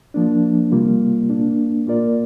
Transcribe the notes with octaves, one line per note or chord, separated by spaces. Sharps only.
F3 A#3 D4
C3 G3 A#3 F4
A#2 A#3 D4
A#2 A#3 F4 A#4 D5